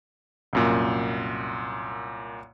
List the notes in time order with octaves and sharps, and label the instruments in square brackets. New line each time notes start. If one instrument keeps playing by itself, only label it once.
[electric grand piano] C2 F#2 A#2